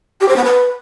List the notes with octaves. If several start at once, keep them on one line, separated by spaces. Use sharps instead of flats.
G4
C5
B3
B4